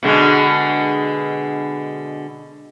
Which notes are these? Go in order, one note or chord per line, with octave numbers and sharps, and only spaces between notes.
B2 D3 G#3